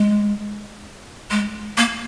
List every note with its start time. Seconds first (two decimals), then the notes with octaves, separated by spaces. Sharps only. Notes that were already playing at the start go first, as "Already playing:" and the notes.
Already playing: G#3
1.30 G#3
1.78 A#3